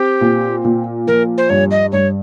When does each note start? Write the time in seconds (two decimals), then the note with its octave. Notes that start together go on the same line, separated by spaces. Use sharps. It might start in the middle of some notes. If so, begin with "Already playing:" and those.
Already playing: C4 G4
0.21 A#2
0.64 A#2
1.07 F3 A#4
1.38 C5
1.49 G2 C#5
1.71 D#5
1.92 G2 C#5